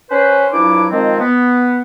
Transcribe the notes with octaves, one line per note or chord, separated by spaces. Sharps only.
C#4 B4 C5
G2 F3 F#3 D4 E4 D6
D#3 F3 G#3 C4
B3